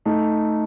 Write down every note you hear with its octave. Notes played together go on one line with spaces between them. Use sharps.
A3 D#4